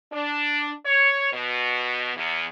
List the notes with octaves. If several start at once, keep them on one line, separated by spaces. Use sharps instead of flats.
D4
C#5
B2
E2